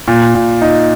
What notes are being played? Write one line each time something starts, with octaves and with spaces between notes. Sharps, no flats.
A#2
A#2
D#4